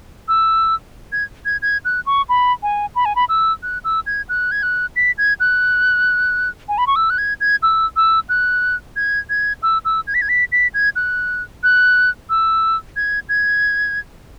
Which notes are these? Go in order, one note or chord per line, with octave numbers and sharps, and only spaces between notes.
E6
G#6
G#6
G#6
F#6
C#6
B5
G#5
B5
G#5
B5
E6
F#6
E6
G#6
F#6
G#6
F#6
B6
G#6
F#6
G#5
B5
C#6
E6
F#6
G#6
G#6
E6
E6
F#6
G#6
G#6
E6
E6
G#6
B6
G#6
B6
B6
G#6
F#6
F#6
E6
G#6
G#6